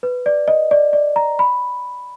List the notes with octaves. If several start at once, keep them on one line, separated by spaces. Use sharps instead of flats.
B4
D5
D#5
D5
D5
A#5
B5